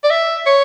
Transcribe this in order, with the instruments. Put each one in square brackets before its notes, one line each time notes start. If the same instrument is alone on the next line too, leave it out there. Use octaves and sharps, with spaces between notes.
[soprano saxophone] D5
E5
C#5